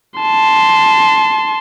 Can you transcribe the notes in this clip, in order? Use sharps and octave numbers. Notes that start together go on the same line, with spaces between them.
A5 C6